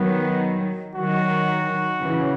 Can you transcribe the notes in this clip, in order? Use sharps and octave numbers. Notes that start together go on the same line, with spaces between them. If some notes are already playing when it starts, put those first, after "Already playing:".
Already playing: D#3 F#3 B3
D#3 F#3 F#4
C#3 E3